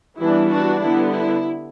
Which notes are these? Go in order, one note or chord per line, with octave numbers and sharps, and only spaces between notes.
E3 G3 B3 D4 E4
D4 F#4
D3 G3 B3 E4
E4